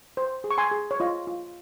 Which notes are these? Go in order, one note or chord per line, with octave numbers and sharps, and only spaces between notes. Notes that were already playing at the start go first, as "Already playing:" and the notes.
C5
G#4
C#6
G#5 C6
G#4
C#5
F4 D#5
F4